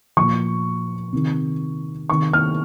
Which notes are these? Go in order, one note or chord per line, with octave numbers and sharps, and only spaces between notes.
A#2 F3 C#6
C3 D#3
C3 D#3 C#6
F6